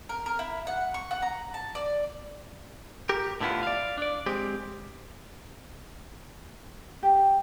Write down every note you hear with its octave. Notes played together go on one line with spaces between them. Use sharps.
A#4
A#4
E4
F#5
C#6
F#5
A#5
A5
D5
G4 A#4
A2 D3 B3 E4 F4
D5 F5
D4 D5
G#3 C4 G4
G4